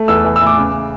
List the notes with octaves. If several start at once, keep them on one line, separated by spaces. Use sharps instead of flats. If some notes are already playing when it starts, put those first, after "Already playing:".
Already playing: A3
E2 E6
E3
E6
A2
D6
C#3